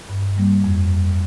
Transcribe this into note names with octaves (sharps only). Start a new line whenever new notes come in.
G2
G3 A#3
F2